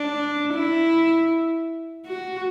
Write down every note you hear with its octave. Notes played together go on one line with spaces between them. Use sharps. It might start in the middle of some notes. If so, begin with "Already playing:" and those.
Already playing: D4
E4
F#4